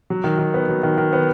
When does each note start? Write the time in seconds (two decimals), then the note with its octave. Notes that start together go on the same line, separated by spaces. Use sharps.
0.10 F#3
0.24 D#3
0.39 D#3
0.54 B3
0.68 F#3
0.83 D#3
0.98 D#3
1.13 B3